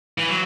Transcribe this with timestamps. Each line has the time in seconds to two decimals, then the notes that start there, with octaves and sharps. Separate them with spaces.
0.18 E3
0.29 F#3